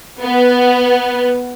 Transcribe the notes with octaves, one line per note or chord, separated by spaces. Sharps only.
B3